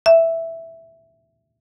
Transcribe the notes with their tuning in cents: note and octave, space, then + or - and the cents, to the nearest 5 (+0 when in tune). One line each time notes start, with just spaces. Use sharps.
E5 +0